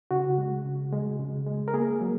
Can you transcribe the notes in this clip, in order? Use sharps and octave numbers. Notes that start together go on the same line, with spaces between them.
C#3 F#4
G#3
C#3
G#3
C#3
G#3
A#4
A#3 G#4
F#3